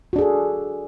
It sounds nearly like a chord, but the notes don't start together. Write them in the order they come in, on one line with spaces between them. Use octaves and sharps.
F#4 D4 G#4 A4